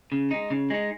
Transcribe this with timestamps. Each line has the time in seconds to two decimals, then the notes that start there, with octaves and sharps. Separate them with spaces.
0.12 C#3
0.31 G#3 D#4
0.50 C#3
0.70 G#3 D#4